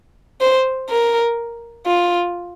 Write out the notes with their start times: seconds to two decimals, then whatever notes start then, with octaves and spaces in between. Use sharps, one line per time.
0.41 C5
0.89 A#4
1.86 F4